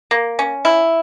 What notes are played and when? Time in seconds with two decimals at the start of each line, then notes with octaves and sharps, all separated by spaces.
0.11 A#3
0.39 C#4
0.65 E4